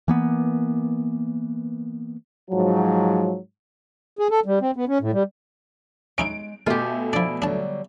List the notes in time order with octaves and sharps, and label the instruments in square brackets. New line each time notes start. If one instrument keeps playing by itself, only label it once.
[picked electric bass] E3 A#3 B3
[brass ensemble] G#2 F3 F#3
[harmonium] G#4
A4
G3
C4
B3
C#4
A2
G3
[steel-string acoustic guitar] G#3 [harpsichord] C#4 D#4 E4 [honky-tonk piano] D7
[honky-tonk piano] B2 A3 [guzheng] F4 G4 [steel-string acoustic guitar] E5 G#5
[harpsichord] F3 D4 [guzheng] E4 D5
[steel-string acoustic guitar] D3 F#3 G3 [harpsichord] D4 A5